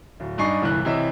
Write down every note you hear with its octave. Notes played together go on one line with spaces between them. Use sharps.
D1
G2 D4 D#4 G#5 C#6 C7
G1 C2 E3 F#6
C3 E3 C#5 D#5 E5